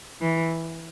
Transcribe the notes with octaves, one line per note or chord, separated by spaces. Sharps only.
E3